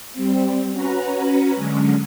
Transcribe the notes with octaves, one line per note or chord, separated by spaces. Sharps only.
G3 C4
C#4 F#4 B4 A#5
D3 F#3 G#3 C#4